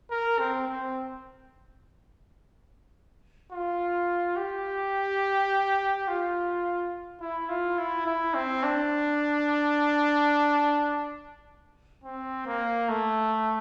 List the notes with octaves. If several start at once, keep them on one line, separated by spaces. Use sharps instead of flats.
A#4
C4
C4
F4
G4
F4
E4
F4
E4
E4
C4
D4
C4
A#3
A3